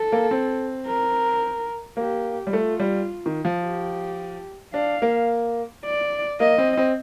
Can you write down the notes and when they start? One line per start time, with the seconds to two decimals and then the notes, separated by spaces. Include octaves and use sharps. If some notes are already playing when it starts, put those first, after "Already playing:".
Already playing: A4
0.12 A#3
0.31 C4
0.87 A#4
1.97 A#3 G4
2.47 G3
2.52 A3 F4
2.80 G3
3.26 D#3
3.45 F3
3.63 G4
4.74 D4 F5
5.02 A#3
5.85 D5
6.40 A#3 D#5
6.58 C4
6.77 C4